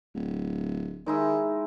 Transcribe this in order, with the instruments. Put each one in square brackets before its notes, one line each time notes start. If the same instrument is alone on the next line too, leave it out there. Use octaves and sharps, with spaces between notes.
[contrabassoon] D1
[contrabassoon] D#3 [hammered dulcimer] G#3 D#4 E4